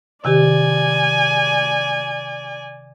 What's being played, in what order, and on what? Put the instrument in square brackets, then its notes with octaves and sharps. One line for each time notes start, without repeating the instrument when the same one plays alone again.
[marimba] C3 D#3 G4 [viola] D5 G#5